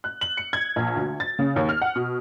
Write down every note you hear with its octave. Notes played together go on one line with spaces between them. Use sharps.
F#6
F#7
C#7
G#6
A#1
D2
A6
C#3
D#2
F6
F#5
B2